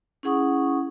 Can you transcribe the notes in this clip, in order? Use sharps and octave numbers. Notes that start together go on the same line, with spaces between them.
C#4 E4 G#4 F#5 C#6 D#6